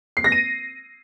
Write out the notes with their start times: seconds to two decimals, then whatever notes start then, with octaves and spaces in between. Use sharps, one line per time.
0.17 C7
0.24 A#6
0.32 D#7